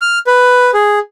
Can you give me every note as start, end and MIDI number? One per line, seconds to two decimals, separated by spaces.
0.01 0.19 89
0.27 0.71 71
0.74 0.99 68